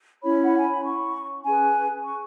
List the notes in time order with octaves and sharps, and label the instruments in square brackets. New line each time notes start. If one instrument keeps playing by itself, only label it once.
[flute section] C#4 E4 C#5 B5
F#5
G#5
B5
C#6
C#4 G#4 B4 G#5
C#6